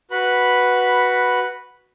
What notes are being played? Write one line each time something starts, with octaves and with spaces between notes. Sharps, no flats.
F#4 B4 B5